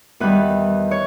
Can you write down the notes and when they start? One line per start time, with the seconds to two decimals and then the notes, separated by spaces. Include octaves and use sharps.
0.20 E2 D#3 G3 B4
0.91 C#5